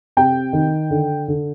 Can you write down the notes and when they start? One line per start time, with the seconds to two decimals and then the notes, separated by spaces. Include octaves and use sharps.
0.17 C3 G5
0.53 D#3
0.90 D3
1.28 D3